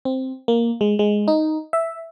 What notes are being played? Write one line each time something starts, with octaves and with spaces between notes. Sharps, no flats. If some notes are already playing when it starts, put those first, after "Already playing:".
C4
A#3
G#3
G#3
D#4
E5